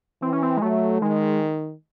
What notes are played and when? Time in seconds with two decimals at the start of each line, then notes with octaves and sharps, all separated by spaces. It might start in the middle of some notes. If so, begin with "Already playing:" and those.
0.22 E3 C4
0.33 C#4
0.43 C4
0.57 G#3
0.62 F#3 A3
1.02 D#3 G#3